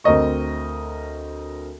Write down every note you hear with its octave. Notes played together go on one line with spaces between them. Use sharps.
D2 C4 A#4 D#5 C#6